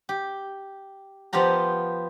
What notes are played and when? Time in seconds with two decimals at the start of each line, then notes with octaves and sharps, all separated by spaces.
0.09 G4
1.33 F3 B3 F4 G4 A#5